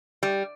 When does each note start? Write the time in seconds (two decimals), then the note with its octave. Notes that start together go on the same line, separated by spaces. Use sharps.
0.23 G3